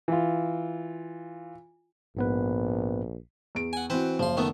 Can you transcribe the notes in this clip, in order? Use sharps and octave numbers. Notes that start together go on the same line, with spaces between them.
E3 F4
A#1 G#2 B3 B4
E2 D7
F#5 G#5
E3 C4 F#4 B4 C5
F#1 F3 C6
D#3 A3 B3